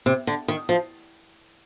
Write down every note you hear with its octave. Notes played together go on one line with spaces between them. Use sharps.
C3
D3
D#3
F3